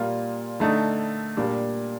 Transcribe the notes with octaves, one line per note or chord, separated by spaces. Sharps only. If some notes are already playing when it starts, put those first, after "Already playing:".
Already playing: A#2 G3 A#3 F4
D3 A3 D#4
A#2 G3 D4